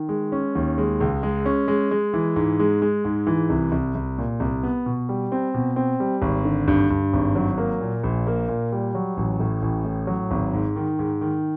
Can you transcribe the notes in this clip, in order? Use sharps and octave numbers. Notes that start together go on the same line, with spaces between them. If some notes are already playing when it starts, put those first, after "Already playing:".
Already playing: D#3
G#3
C#4
D#2
G#3
C#2
G#3
C#4
G#3
G#3
E3
G#2
G#3
G#3
G#2
E3
C2
C2
C2
A#2
C2
B3
B2
G3
C4
B2
C4
G3
G#1
D3
G2
G2
G#1
F#3
A#3
A#2
A#1
A#3
A#2
G3
F#3
A1
A2
A1
A2
F#3
G#1
G#2
D#3
G#2
D#3